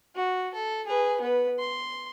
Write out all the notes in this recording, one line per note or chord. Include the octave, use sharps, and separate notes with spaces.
F#4
A4
G#4 B4
B3 B4
C6